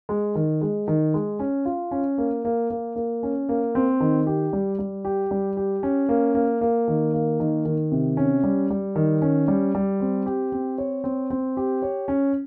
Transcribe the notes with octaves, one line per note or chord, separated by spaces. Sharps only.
G#3
D#3
G#3
D#3
G#3
C#4
F4
C#4
A#3
A#3
A#3
A#3
C#4
A#3
C4
D#3
G4
G3
G3
G4
G3
G4
C#4
A#3
A#3
A#3
D#3
A#3
D#3
D#3
C3
C#4
G3
G3
D#3
C#4
G3
G3
C4
G4
C4
C#5
C4
C4
G4
C#5
C#4